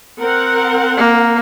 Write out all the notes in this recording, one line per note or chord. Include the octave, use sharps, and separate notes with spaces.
C4 A#4 F#5
A#3